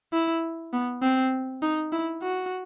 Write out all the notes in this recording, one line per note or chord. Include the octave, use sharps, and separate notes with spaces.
E4
B3
C4
D#4
E4
F#4